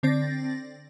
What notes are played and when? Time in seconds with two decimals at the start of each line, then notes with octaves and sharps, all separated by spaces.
0.03 D3 C4 D5 A6 A#6